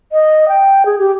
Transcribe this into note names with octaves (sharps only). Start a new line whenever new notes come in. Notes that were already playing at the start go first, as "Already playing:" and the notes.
D#5
G5
G#4
G4